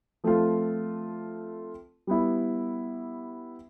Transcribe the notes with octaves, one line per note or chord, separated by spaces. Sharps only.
F3 A3 C4 F4
G3 B3 E4